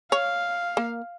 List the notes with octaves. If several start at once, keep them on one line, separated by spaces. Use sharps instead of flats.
C#5 F5
A#3